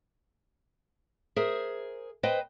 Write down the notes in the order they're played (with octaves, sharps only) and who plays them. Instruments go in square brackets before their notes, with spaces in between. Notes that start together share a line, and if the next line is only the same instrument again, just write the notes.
[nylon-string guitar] G#4 A#4 C5 E5
B4 C5 D#5 G5